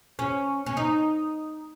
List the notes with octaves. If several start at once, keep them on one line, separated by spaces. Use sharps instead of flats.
C#4
C#4
D#4